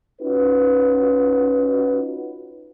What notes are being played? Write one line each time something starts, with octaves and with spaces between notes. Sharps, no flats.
C#4 D#4 F4 F#4 B4